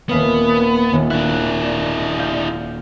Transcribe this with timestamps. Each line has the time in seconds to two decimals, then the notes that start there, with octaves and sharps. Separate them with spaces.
0.09 D#1 A#3 B3 B4
0.93 D#1
1.10 D4 E4 F#6
2.19 F5 G6